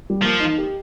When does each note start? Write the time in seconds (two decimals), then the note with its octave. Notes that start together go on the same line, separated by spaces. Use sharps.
0.10 G3
0.22 F3 A#3
0.40 D#4
0.58 G4